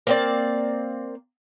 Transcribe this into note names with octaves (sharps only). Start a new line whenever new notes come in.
A#3 C4 D5